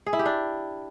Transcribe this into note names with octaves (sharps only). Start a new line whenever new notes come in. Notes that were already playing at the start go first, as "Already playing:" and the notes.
G#4
E4
G4
D4